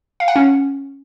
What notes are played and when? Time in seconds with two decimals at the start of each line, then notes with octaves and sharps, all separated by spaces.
0.20 F5
0.28 F#5
0.36 C#4